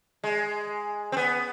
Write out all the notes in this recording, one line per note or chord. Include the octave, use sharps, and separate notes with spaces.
G#3
C4
B3